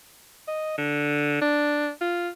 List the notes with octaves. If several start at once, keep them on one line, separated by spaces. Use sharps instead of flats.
D#5
D3
D4
F4